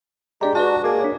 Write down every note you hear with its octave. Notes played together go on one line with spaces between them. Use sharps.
G#3 D4 G4 D5 A#5
F#4 B4 D5 A5
A#3 G#4 D6
D4 C#5